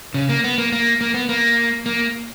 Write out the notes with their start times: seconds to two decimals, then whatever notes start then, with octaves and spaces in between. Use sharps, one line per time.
0.14 C#3
0.29 A#3
0.44 B3
0.58 A#3
0.72 A#3
1.01 A#3
1.14 B3
1.29 A#3
1.86 A#3